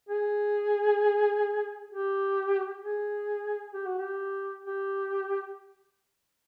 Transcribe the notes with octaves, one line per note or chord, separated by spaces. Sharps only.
G#4
G4
G#4
G4
F#4
G4
G4